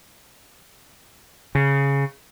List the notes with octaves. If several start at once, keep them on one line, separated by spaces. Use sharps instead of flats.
C#3